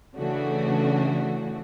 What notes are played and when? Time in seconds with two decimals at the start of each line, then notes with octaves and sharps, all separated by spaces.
0.16 C#3 E3 A3 D4 F#4